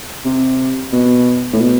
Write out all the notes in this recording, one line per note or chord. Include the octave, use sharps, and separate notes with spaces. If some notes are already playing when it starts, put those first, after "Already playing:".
C3
B2
A2
B2